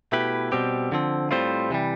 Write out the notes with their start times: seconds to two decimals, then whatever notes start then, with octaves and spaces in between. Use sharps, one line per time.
0.12 B2 A3 E4 G4 B4
0.52 B2 G3 C4 G4
0.92 D3 F3 C4
1.31 A2 G3 C4 F4 C5
1.70 C3 E3 G3